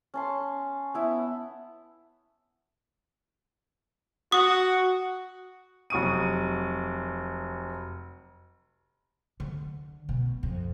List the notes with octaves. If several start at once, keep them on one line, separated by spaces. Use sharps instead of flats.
C#4 A5 C6
B3 E4
F#4 D#6
F1 F#3 C#6 D#6 D#7
D3
B2
F2